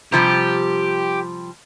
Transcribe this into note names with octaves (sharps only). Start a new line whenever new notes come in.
C3 F3 G3 G4